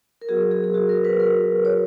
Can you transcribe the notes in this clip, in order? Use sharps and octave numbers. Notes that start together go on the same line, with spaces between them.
A#4
F#3 B3 F#4 G#4
G#4
G#4
F#4
A#4
B4
A#4
C#5